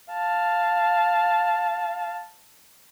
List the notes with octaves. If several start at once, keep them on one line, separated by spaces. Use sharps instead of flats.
F5 A5